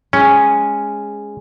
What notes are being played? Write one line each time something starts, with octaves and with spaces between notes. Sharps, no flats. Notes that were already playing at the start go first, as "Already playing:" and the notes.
G#3 C#4